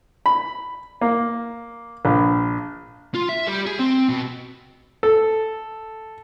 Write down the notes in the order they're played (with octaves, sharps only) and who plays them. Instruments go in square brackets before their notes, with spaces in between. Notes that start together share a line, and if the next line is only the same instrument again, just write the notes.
[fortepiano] B5
A#3
A#1
[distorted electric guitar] F4
E5
G3
G#4
C4
B2
[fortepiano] A4